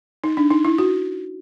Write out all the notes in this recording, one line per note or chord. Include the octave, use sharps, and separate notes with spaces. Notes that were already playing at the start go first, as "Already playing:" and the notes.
D#4
D4
D#4
E4
F#4